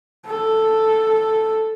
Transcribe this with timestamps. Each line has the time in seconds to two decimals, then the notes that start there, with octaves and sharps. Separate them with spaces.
0.26 A4